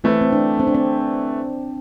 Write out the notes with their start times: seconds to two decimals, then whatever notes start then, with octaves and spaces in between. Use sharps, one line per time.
0.04 E3 A3 C4 E4 A4
0.21 C4
0.33 D4
0.59 C4
0.67 D4
0.74 C4